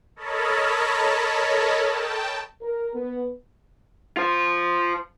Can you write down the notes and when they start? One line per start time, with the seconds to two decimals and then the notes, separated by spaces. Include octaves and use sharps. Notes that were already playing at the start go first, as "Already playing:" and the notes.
0.16 A4 A#4 C#5 D#5 A5 B5
1.88 G5 A5
2.62 A#4
2.95 B3
4.17 F4 C5